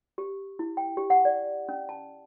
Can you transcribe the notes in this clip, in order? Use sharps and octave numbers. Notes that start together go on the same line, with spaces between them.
G4
E4
G5
G4
F#5
D5
C#4
A5